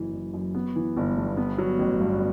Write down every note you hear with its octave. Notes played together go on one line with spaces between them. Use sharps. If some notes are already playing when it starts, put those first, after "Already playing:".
Already playing: F#1 F#2 E3
F#1
F#2
B3
E3
G1
G2
B3
F#3
A1
G2